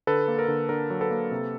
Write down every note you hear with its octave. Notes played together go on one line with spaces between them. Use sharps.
D3 A4 B4
A#3
A#4
D3
D3 A#4
F#3
A4 B4
A#3
C3